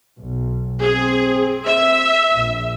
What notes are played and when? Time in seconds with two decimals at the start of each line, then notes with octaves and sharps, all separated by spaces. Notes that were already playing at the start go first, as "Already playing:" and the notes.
0.18 B1
0.81 C4 G#4
1.65 E5
2.31 A#1